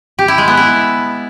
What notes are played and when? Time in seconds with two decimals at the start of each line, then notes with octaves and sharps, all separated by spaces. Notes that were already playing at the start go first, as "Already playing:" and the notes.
0.19 G4
0.28 E4
0.38 G#3
0.48 B3
0.57 E4